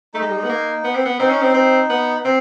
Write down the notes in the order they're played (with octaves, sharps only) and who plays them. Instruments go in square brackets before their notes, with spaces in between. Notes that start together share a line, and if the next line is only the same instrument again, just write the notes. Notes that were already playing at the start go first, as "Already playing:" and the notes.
[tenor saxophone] A3 [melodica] D#4
[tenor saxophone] G#3
G3
G#3
B3
A#3
B3
C4
B3
[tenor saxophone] C4 [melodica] D#4
[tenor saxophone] C#4
C4
C4
B3
C4